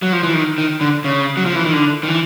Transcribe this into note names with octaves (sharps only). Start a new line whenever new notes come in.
F#3
F3
E3
D#3
D#3
D3
C#3
F#3
F3
E3
D#3
D3
D#3
E3